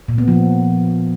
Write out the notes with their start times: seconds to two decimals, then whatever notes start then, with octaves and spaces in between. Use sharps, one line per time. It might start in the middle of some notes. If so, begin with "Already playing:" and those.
0.08 A#2
0.18 B3
0.28 F3